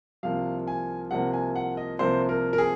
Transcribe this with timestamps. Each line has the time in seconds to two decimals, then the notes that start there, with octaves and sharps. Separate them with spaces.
0.23 C2 C3 F3 A#3 F5
0.67 G#5
1.11 C2 C3 F3 A#3 F#5
1.33 G#5
1.56 F#5
1.77 D#5
1.99 C2 C3 F3 A#3 C5
2.29 A#4
2.53 A#4
2.58 G#4